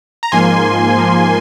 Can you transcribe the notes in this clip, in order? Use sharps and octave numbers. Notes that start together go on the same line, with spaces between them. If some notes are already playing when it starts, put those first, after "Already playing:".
A#5
G#2 F3 A#3 G#5 C6
G#2 F3 A#3